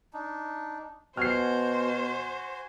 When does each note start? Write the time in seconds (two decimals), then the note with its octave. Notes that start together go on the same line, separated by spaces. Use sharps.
0.13 D4 D#4
1.17 B2 F#4 C5 G#5 F6 C7